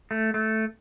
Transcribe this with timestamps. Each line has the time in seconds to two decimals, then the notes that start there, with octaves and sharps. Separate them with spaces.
0.11 A3
0.34 A3